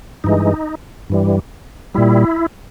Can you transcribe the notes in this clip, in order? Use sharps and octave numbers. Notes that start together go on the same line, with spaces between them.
G2 E3 G#3 D#4
G2 E3 G3
A#2 G3 E4